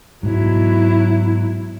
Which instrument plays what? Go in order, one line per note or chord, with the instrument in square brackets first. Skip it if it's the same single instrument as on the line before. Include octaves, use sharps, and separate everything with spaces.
[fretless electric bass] G#2 B2 G#3 [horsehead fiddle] F#3 E4